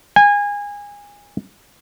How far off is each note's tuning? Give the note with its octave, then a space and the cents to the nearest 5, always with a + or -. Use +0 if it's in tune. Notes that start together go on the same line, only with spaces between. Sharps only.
G#5 -25